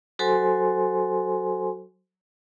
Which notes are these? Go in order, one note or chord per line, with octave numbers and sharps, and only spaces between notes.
F#3 F#4 A4 C5 G#5 C6